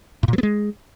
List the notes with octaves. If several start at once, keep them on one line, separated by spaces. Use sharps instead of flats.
A2
A#2
F#3
B3
G#3